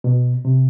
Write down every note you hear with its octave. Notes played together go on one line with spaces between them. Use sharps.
B2
C3